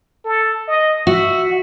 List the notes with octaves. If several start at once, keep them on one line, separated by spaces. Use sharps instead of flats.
A4
D#5
F#4 E5